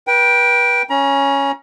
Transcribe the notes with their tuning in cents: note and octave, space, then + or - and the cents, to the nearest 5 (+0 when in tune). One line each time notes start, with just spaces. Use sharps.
B4 -35 G5 +0
C#4 +0 A#5 +40